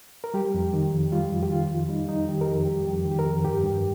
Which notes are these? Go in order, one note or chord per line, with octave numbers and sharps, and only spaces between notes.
A#4
G3 G4
F2
D#3
F2
G3 F4
F2
G4
D#3 F4
F2
G3 D#4
F2 D#4
D#3 G4
A#4
F2 G4
G3 G4
F2
G4
D#3
G4
A#4
F2
G2 G4
G2